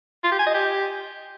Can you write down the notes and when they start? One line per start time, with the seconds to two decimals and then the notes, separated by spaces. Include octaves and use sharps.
0.24 F4
0.31 G4
0.39 G#5
0.46 D#5
0.54 G4